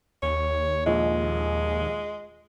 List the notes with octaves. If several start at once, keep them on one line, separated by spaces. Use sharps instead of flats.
D#2 C#5
A#1 G#3 D#5